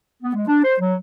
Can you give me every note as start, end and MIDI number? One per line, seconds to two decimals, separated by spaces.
0.23 0.34 59
0.35 0.47 56
0.47 0.61 62
0.64 0.75 72
0.80 0.95 54